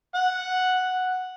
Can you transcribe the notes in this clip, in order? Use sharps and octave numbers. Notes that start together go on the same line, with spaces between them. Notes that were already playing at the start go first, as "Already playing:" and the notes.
F#5